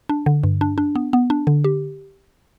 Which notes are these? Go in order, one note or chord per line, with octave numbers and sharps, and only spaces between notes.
D4
D3
G2
D4
D4
B3
B3
D4
D3
G4